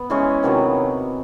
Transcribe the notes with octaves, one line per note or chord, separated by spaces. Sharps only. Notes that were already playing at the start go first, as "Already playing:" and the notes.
Already playing: B3
E3 G#3 C#4
C3 D#3 F#3 B3